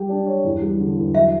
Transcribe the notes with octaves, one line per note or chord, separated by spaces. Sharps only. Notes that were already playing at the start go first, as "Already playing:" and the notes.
Already playing: G3 G4
D4
C#5
E2
G3
D3
E2
F#3 E5